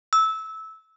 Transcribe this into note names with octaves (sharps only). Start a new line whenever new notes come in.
E6